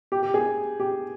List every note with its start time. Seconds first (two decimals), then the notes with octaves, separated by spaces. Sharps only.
0.12 G4
0.23 G4
0.34 G#4
0.80 G4